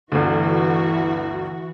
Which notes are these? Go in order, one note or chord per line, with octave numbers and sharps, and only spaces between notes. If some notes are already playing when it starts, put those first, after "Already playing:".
G1 D2 E3 F#4